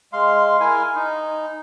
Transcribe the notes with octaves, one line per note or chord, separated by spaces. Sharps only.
G#3 F5 C6
E4 A#4 G#5
D#4